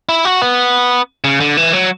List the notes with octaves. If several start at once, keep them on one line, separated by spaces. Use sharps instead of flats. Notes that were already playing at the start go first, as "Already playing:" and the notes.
E4
F#4
B3
C#3
D3
E3
F#3